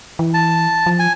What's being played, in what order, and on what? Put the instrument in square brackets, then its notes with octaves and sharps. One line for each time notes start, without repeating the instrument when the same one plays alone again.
[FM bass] E3
[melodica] A5
[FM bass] F3
[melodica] G#5